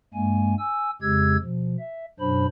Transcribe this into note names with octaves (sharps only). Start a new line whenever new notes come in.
G2 G#3 A#3 G#5
G#5 E6
F2 C#3 G#3 G4 E6 G#6
B2 F3
E5
F#2 B2 F#3 D4 C5 B5